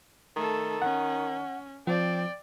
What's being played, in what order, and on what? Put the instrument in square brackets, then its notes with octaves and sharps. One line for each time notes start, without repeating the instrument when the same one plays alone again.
[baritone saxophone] D#3 [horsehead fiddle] A3 A4
[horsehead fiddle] C#4 [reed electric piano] F#5
[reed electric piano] F3 [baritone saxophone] C4 [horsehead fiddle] D5 G5